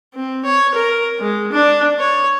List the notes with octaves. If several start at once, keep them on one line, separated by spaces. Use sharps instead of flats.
C4
C#5
A#4
G#3
D4
C#5